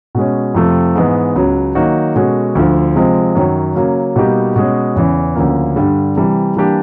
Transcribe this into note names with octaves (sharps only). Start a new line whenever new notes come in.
B2 G#3 C#4
F2 C3 F3 A3
G#2 E3 G#3 B3
C#2 C#3 F#3
D#3 F#3 A#3 D#4 F#4
B2 G#3 C#4 F#4 A4
D2 D3 F3
C3 F3 G#3 C4
F#2 D#3 F#3
C#3 F#3 A#3
B2 G3 A#3 D#4 G4
B2 G#3 C#4
E2 C#3 E3
D2 C#3 F3 A#3
G2 D3 G3
C3 E3 G3
E3 G3 A#3 D4 G4